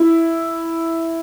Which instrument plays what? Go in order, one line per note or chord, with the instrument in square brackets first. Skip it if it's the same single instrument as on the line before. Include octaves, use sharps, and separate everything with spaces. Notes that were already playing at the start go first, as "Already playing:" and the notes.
Already playing: [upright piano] E4